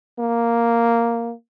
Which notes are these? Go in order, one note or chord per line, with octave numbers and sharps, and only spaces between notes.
A#3